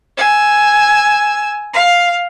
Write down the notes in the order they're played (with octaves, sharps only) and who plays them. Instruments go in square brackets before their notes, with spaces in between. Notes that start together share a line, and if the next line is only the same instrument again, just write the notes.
[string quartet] G#5 E6
F5